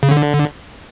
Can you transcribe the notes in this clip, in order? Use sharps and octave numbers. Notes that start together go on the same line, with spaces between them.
C#3
D3